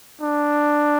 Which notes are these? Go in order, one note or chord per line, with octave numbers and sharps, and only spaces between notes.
D4